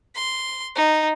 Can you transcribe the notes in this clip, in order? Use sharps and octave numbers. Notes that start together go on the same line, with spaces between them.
C6
D#4